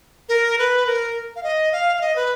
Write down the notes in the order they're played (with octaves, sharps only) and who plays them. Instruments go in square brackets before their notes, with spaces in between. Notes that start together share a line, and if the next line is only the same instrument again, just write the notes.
[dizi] A#4
B4
A#4
F5
D#5
F5
F5
D#5
B4